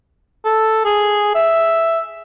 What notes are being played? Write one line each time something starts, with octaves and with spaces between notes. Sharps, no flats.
A4
G#4
E5